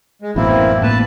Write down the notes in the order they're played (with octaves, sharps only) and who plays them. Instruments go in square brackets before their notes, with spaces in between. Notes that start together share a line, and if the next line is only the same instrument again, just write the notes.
[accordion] G#3
[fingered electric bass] A1 F#2 B2 [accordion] A#3 C4 E4
[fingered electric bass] A2 A#3 B3 [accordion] B4 A5